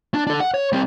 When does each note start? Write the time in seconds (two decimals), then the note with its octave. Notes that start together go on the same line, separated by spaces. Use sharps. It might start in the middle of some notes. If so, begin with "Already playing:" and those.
0.14 D4
0.27 D4 A4
0.40 F#5
0.54 C#5
0.73 G3 C4